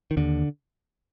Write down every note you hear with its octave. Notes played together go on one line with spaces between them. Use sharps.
D#3
D#2 D3